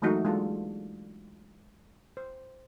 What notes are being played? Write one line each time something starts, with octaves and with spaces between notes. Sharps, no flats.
E3 F#3 G#3 A3 D#4 F#4
G#3 A#3 D4 F4 A4
C5